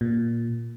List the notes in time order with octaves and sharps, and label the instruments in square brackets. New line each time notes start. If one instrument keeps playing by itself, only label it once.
[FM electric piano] A#2